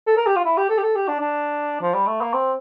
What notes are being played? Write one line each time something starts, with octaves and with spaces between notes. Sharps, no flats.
A4
A#4
G4
F4
E4
G4
A4
G4
A4
G4
D4
D4
F3
G3
A3
A#3
C4